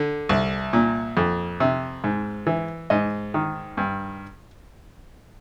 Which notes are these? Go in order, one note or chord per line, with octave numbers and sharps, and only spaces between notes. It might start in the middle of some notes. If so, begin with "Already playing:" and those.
Already playing: D3
C2
A#2
F2
C3
G#2
E3
G#2 D#5
D#3
G2